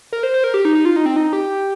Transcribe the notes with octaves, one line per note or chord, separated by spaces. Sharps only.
A#4
C5
C5
A#4
G4
D#4
D#4
F4
D#4
C4
D#4
G4